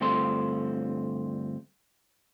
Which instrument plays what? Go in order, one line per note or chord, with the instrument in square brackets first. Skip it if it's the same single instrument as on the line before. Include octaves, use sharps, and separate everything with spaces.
[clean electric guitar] D2 G2 C4 F4 A4 C6